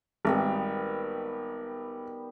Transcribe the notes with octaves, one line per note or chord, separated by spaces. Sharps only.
G#1 D#3 G3 B3